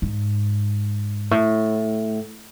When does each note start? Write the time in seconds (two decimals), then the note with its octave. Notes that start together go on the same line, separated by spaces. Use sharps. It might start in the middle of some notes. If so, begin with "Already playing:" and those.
0.02 G#2
1.31 A2